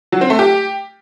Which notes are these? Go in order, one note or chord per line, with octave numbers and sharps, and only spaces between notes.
F#3
C4
A3
G4